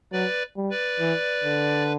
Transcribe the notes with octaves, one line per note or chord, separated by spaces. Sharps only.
F#3 B4 D5
G3
B4 D5
E3
D3